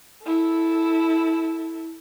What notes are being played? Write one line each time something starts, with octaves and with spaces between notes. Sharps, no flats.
E4 A4